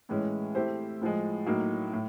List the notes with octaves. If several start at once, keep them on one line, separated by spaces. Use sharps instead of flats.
A2 E3 G#3 C#4
A3 C4 E4 G4 C5
A2 F3 G#3
A2 F#3 A#3 D#4
A2